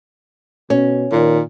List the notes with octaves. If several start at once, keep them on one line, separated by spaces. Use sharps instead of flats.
B2 C#4
A#2 D#3